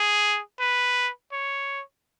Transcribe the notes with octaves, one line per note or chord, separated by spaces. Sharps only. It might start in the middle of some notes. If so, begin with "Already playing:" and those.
Already playing: G#4
B4
C#5